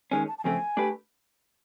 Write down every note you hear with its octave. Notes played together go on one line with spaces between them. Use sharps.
D#3 G#3 C#4 G#5
A5
A5
F2 C#3 F3 A3 C4 G#5
A3 D4 G4 B4